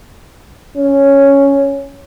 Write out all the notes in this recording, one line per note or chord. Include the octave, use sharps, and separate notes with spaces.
C#4